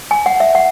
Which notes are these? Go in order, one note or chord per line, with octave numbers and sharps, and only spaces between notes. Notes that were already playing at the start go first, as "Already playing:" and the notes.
G#5
F#5
E5
F#5